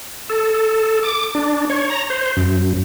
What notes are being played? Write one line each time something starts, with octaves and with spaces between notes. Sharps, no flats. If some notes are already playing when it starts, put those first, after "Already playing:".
A4
D6
D4
C#5
A#5
C5
F#2